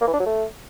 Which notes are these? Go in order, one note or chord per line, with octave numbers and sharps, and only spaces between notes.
A#3
E3
D4
F#3
A3